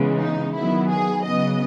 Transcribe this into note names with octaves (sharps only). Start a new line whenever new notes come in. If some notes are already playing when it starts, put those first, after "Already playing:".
Already playing: C#3 E3 G#3 B3
D#4
D#3 F#3 B3 E4
G#4
C#3 F#3 B3 D#5